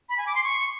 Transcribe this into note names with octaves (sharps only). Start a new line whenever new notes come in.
B5
G#5
D6
C6
C#6